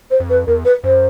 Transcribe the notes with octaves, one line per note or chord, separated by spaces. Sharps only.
C5
F2
B4
E2 A#4
B4
F#2 C5